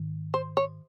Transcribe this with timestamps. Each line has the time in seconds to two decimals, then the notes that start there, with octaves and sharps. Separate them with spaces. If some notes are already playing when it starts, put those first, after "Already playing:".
Already playing: G#2 D#3
0.34 C5
0.57 C#5